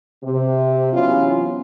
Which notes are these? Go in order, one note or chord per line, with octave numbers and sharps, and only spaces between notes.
C3
E3 F#3 B3 C#4 F4